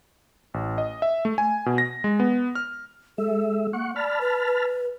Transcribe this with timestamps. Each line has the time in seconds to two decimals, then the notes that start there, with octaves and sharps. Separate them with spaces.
0.54 A1
0.78 D#5
1.02 E5
1.25 A3
1.38 G#5
1.66 B2
1.78 A#6
2.04 G#3
2.20 B3
2.55 F6
3.18 G#3 A4 E5
3.73 A#3 F#5 C#6
3.96 D5 A5 B5 F6
4.21 B4
4.47 B4